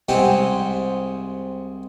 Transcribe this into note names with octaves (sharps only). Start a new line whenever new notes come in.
C2 G#3 C4 G4 B4 F#5